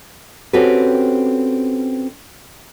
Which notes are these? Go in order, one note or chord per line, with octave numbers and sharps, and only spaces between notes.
C4 C#4 F#4 G4 A4 B4